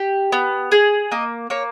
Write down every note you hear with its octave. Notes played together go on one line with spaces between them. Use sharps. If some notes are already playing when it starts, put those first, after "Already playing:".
Already playing: G4
B3
G#4
A#3 D#5
A#3 C#5